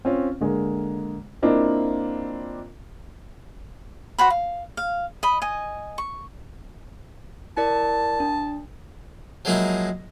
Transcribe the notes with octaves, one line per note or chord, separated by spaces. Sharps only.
C4 C#4 F4
D3 G#3 A#3
A#3 C4 D4 E4 F4 D#5
F#4 C5 F#5 B5
F5
F5
D#5 B5
D#5 G#5
C#6
E4 A#4 D5 A5
D4
F3 F#3 G#3 A#3 D#4 E4